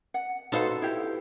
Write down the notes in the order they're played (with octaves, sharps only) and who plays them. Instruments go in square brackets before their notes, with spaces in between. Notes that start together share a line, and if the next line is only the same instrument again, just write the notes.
[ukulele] F#5
[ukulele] D#4 F#4 F5 [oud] A4 B4 C5
[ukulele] E4 G4 G5